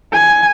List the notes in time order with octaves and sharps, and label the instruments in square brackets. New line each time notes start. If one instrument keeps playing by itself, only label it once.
[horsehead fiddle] G#5